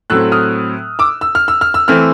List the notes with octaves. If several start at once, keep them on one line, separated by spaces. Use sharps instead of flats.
A2 F#3 A3 C4 E6 F#6
D#6 F6
D6 E6
E6
F6
E6
F6
E6
E3 A3 C4 F6